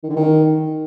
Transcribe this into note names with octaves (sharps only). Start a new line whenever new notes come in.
D#3
D3
D#3